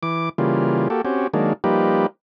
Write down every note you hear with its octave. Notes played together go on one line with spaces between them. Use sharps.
E3 D6
C#3 E3 G3 A#3 F4
A#3 F#4 G4 A4
C4 C#4 F#4 G4
D#3 F#3 G#3 A#3 D4
F3 G3 A#3 D#4 G4 B4